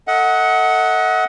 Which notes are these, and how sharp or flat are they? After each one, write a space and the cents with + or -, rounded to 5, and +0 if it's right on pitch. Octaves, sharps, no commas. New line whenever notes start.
A4 +25 D#5 +40 F#5 +0